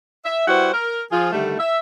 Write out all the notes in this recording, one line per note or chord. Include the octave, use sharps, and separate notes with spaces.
E5
G3 E4 F#4 B4 C5 F#5
A#4
F3 F4 G#4
D3 D#3 G3 A3
E5